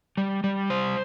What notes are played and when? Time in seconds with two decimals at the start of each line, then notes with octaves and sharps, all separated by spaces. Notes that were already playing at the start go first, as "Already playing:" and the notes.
0.17 G3
0.44 G3
0.70 C5